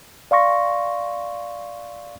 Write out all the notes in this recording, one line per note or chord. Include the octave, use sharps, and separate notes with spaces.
D5 F5 C6 C#6 A#6